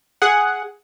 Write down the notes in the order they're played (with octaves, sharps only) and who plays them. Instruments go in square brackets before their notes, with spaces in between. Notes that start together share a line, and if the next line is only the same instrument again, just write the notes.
[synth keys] G#4 F#5